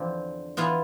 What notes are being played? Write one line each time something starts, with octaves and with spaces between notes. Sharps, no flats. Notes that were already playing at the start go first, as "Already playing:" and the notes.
Already playing: E2 D3 F3 C4
E3 B3 F4